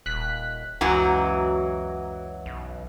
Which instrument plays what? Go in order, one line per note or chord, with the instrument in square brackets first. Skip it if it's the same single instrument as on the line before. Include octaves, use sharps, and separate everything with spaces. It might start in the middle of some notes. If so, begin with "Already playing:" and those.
[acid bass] D#1 [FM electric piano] F#6 B6
[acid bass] C#2 [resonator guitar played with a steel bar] F#2 E3 F#3 [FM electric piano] F#4 G#5 A#5
[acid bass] B1